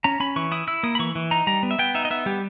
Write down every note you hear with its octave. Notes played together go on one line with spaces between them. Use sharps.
C#4 A#5
C#4 B5
E3 C#6
E4 D#6
E4 E6
A#3 D#6
B5
E3 C#6
E3
D#4 A#5
G3 A#5
B3
E5
B3 G5
D#4 E5
D#5
B3 E5
G3 G4